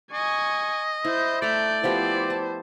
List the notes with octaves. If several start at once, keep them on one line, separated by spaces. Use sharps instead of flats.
D#5 G#5 C#6
E4 C5 G6
A3 D5 E5 A#5 G6
F3 B3 E4 G4 C5
A5